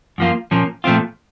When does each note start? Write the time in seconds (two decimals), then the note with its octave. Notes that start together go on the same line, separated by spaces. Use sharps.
0.18 F#2 F3 A#3 F4
0.51 A#2 F3 A#3 C#4
0.84 A#2 F3 A3 C4 F4